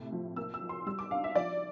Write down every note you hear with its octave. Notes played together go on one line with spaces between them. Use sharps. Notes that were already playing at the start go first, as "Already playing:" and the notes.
Already playing: A2 C3
F3
A#3 E6
E6
F3
C6
G3 E6
D6
D4 F5
E5
F3 D5